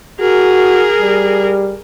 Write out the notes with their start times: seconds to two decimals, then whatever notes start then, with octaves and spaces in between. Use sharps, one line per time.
0.20 F#4 G#4 A#4
0.99 G3